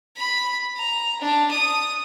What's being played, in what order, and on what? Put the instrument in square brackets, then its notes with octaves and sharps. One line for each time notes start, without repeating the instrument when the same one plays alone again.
[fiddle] B5
A#5
D4
D#6